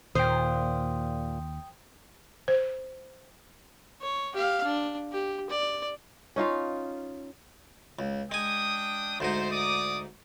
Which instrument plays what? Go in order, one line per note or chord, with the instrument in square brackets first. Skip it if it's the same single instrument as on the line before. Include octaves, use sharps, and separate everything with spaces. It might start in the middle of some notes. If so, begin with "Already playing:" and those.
[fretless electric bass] D#2 [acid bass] A#2 [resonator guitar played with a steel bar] C5 [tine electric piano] G5 D#6
[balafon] C5
[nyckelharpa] C#5
G4 F5
D4
G4
D5
[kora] C#4 D#4 F4 F5
[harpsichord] C#2
[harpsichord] G#3 G#5 [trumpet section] D4 G5 D#6
[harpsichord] D2 G#2 D#4 [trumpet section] C5
[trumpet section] D5 D6 D#6